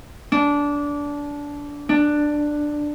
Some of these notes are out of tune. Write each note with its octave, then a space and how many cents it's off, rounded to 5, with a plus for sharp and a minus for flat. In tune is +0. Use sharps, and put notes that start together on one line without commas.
D4 -20
D4 +10